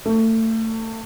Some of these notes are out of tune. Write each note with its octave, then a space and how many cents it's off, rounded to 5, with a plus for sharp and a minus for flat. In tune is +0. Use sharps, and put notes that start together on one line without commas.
A3 +30